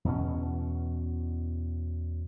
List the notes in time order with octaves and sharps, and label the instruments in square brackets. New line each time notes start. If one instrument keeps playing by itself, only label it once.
[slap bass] E2 B2 C#4